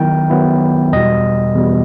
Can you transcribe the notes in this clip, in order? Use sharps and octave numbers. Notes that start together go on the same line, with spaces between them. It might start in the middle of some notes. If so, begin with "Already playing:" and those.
Already playing: D#3 F#3 B3 E4 G5
D#3 F#3 B3 E4
E2 B2 G3 D#5
E2 B2 G3